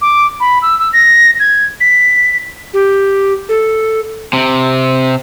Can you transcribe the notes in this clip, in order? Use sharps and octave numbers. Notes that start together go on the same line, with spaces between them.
D6
B5
E6
E6
A#6
G#6
B6
G4
A4
C3